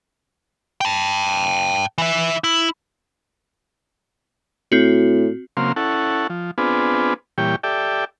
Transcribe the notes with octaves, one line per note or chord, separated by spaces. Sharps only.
G5 A5
E3 E5
E4
A2 C4 F#4
C#3 F#3 A#3 C4 F5 C6
C#4 E4 A4 F#5
F3
B3 C4 D4 F4 G#4 B4
A#2 E3 G3 G4 C#5 G5
G4 A4 D5 E5 G5